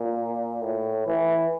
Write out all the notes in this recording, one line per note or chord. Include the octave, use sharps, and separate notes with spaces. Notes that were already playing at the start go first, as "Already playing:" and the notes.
Already playing: A#2
A2
E3